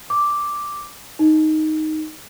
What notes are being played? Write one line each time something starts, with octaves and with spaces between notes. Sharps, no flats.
D6
D#4